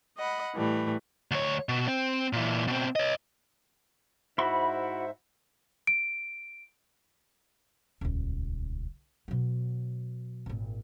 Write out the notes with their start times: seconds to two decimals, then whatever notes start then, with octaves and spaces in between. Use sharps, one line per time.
0.17 D#5 F#5 B5
0.54 A2 E3 G3 A3
1.31 D2 C#5
1.69 B2
1.88 C4
2.33 A#2 E3
2.67 B2 C4
2.96 C#5 D#5
4.38 G#2 E4 F#4 C5 E5 B5
5.87 D7
8.01 D#1 C#2
9.28 B2 F#3
10.46 G#1 A#2